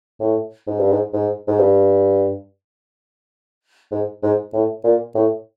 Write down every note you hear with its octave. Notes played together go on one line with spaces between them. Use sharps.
A2
G#2
G2
G#2
G#2
G#2
G2
G#2
G#2
A2
A#2
A2